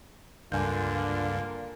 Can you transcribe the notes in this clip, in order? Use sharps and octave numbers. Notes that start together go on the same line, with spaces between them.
C#2 G2 D3 A#3 D4 F4 G#5 G6